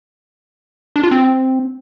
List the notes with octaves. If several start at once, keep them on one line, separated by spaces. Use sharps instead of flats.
D4
F4
C4